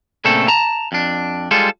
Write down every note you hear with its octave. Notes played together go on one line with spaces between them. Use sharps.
A#2 C#3 A3 C4 A4
A5 A#5
F2 D4
G3 G#3 F4 A4